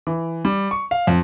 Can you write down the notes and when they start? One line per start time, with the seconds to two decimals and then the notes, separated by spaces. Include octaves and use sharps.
0.07 E3
0.45 G3
0.71 C#6
0.91 F5
1.07 F2